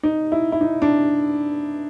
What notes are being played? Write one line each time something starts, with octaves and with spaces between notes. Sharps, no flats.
D#4
E4
E4
D#4
D4